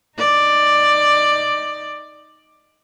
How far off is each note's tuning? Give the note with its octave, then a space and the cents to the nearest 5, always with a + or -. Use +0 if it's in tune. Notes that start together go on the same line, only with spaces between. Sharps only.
D#4 +0 D5 +10